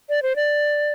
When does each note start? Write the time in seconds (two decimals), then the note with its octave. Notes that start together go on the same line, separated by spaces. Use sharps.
0.09 D5
0.23 C5
0.36 D5